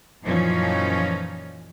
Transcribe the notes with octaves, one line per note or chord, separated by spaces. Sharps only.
F#2 A#2 E3 F3 C#4 D#4